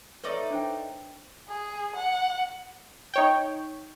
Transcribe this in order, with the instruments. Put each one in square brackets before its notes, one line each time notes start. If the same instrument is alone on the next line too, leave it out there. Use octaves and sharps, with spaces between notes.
[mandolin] A3 D#4 D5 [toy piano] B4 C#5
[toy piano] D4 C5 G5
[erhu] G#4
F#5
[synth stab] D#4 C#5 G5